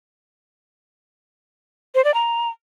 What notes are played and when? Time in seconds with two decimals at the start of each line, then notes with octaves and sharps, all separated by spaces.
1.95 C5
2.04 D5
2.14 A#5